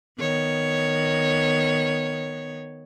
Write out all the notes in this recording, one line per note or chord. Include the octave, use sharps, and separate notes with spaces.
D#3 B3 C#5